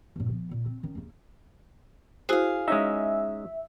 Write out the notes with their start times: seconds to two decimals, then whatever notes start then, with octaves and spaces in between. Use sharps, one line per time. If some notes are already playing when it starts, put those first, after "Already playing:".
0.16 G2 A#2
0.28 F3 B3
0.51 A#2
0.66 C4
0.83 D#3 C#4
0.95 D#2 C#3
2.29 E4 F#4 G#4 C5 F5
2.68 G#3 C#4 D#4 E5